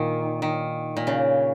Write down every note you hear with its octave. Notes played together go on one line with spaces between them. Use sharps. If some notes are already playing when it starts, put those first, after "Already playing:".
Already playing: A#2 D#3
D#3
A#2
C#3